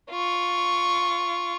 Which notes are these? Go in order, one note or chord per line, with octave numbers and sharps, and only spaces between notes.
F4 C#6